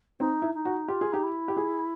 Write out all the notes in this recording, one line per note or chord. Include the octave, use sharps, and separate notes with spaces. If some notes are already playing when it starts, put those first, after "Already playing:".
C4 D#4
E4
D#4
F#4
F4 G4
G#4
D#4 G4
E4
G4
G#4